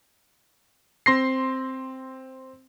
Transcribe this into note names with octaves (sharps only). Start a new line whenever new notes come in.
C4 C6 A#6 C7